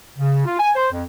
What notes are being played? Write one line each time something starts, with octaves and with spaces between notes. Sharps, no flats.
C#3
F4
G#5
C5
F2